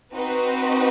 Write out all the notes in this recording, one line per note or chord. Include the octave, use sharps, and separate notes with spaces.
C4 D#4 F#4 B4